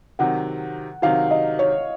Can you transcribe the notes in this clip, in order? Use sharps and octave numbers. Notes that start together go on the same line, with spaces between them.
C3 D#3 F#3 F#5
C3 D#3 F#3 F5
D#5
C#5